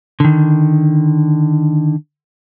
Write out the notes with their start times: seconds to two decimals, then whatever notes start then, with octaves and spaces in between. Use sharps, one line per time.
0.20 D3 D#3